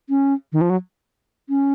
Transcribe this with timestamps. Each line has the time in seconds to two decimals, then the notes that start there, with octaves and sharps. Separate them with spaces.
0.09 C#4
0.52 D#3
0.61 F3
0.70 F#3
1.49 C#4